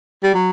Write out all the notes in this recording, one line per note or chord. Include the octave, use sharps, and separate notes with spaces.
G3
F#3